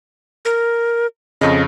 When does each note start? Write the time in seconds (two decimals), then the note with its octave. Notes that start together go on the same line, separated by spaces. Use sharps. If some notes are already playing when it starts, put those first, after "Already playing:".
0.45 A#4
1.41 F2 C#3 D#5